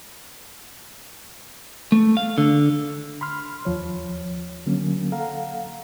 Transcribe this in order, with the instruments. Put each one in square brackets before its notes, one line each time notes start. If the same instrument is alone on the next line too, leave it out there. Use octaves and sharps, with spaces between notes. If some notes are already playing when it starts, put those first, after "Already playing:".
[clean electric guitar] A3
F5
D3
[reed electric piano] B5 C6 F6
D#2 F3 C#5
D3 F#3 A#3 C#4
A4 F5 F#5 A#5